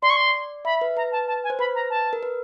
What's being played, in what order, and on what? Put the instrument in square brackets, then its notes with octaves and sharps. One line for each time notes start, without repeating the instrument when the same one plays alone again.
[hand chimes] D5 [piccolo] C6
[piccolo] C#6
C6
[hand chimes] E5 [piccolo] B5
[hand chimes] B4
[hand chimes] B4 [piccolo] A#5
[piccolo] A5
A5
G#5
[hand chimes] C5
[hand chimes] B4 [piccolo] B5
[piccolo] A#5
A5
[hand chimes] A#4
B4